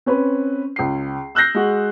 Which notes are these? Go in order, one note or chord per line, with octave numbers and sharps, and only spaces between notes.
C4 C#4 B4
C#2 C7
E6 F#6 G6 A#6 C7
G#3 F#4